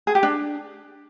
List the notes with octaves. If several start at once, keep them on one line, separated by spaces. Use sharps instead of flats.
G#4
G4
D4